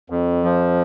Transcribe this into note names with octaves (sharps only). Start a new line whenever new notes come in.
F2
F3